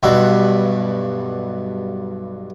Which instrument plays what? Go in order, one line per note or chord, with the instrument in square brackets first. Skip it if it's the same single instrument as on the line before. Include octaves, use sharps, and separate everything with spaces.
[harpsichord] B1 G2 B2 F#4 E5